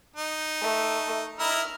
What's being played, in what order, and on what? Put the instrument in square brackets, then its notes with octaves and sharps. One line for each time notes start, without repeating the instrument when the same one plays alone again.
[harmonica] D#4
[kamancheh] A3
[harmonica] E4 D#5 A#5 [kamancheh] F6